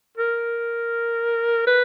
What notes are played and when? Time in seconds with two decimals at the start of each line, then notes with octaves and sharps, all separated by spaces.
0.17 A#4
1.67 B4